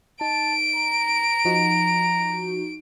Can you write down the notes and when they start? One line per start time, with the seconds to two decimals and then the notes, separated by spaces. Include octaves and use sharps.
0.21 D#4 A5 D7
0.76 A#5
1.45 F3 D#4 F#4